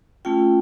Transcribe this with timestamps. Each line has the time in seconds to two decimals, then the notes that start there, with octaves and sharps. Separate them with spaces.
0.25 A3 C#4 F4 G5